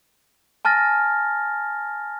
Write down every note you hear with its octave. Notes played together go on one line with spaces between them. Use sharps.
G#5 A5 F6 A6 A#6